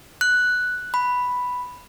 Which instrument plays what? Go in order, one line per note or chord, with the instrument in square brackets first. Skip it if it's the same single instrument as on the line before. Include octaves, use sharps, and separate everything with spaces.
[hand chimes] F#6
B5